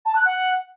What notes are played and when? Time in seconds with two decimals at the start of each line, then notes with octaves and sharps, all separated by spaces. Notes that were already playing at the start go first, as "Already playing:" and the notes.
0.05 A5
0.15 F#6
0.25 F#5